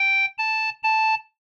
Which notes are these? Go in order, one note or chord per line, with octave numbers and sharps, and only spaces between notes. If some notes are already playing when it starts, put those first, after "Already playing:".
Already playing: G5
A5
A5